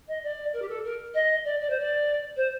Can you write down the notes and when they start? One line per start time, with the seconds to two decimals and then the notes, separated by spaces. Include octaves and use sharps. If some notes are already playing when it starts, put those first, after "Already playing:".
0.08 D#5
0.24 D5
0.53 A#4
0.62 G4
0.69 A4
0.84 A#4
1.14 D#5
1.45 D5
1.60 D5
1.70 C5
1.80 D5
2.37 C5